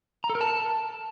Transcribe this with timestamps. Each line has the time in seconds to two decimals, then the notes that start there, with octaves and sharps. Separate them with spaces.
0.24 A#5
0.30 A4
0.35 A#4
0.41 A5